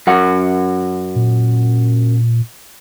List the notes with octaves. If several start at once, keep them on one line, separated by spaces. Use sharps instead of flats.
F#2 F#4 F#5
A#2